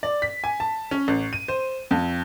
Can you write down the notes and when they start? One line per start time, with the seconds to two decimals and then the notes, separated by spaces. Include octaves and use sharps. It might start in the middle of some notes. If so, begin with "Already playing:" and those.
0.03 D5
0.22 B6
0.44 G#5
0.60 A5
0.91 C#4
1.08 A1
1.33 D#7
1.48 C5
1.91 F2